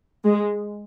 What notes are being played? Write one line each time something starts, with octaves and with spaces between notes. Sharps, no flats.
G#3